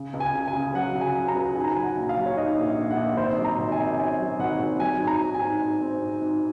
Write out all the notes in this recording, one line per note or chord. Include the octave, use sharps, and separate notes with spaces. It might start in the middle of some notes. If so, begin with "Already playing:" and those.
Already playing: C#3
C#2
G#5
C#3
G#5
C#3
F#3 F#5
C#3
G#5
F#3
A#5
C#2
G#2 G#5
A#5
G#5
F#3
F#5
A#1
F5
F#3
C#5
G#2 D#5
A#1
A#1
F#5
A#1
G#1 C5
F#3
A#5
G#1
G#5
G#1
C#4 G#5
F#3
G#1 F#5
G#1
F#3 G#5
G#2
A#5
G#2
G#5
G#2
G#2
C4
G#2
G#2